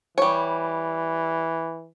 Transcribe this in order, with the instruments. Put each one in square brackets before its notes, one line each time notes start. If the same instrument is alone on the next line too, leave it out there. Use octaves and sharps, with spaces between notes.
[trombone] E3 [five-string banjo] G3 C#5